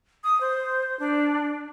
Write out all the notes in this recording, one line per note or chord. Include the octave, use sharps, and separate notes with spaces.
D#6
C5
D4